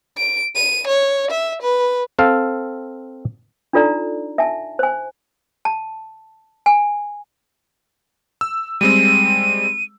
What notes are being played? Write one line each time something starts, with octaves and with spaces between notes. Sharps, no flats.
D7
D#7
C#5
E5
B4
C4 A4 F5
D4 D#4 F4 A4 D5 A#5
E5 G#5 A5
C5 G#5
A5
G#5
E6
G3 G#3 C4 D#7